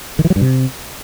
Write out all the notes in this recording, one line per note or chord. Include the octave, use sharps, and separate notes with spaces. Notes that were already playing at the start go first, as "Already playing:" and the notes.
D#3
E3
F#3
G2
C3